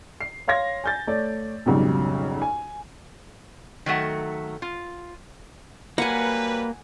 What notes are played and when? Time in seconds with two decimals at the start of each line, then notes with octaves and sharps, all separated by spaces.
0.21 C7
0.48 C#5 F5 C6 G#6 A#6
0.84 G#5 G6 A6
1.07 A3 C#5 D5
1.66 B1 F2 G#2 C#3 F#3 G3
2.42 G#5
3.86 D#3 F#3 A3 F#5
4.62 F4
5.98 F#3 G3 A#3 B4 F#5 G#5